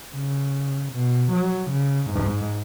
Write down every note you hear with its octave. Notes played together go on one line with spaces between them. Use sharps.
C#3
B2
F#3
C#3
G#2